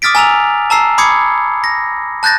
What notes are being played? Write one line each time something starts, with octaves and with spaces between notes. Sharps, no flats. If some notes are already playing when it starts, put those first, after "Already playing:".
D6 D#6 F6 A6 B6 D7
G#5 A#5 E6 F7
A5 A#5 E6 C7
B5 D6 D#6 G#6 C7 C#7
A#6
A5 F#6 G6 A6 A#6